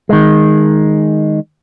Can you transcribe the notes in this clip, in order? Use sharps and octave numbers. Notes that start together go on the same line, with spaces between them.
D#3 G#3